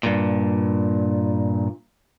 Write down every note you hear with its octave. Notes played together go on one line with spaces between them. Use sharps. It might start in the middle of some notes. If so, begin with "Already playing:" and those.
G2 A#2